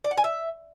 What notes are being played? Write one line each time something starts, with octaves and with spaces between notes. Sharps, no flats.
D5
F#5
G#5
E5